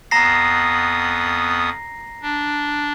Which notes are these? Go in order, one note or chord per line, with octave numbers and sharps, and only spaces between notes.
F2 B3 A#5 D#6 A#6 C7
D4